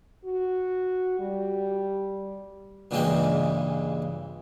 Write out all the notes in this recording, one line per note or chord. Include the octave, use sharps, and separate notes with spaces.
F#4
G3
G2 A#2 C#3 E3 G#3 G5